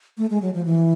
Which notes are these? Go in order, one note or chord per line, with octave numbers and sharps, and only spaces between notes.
A3
G#3
F#3
F3
E3